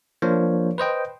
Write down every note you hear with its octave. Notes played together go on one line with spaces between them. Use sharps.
F3 A#3 D4 C5 C#5
B4 C5 D#5 G5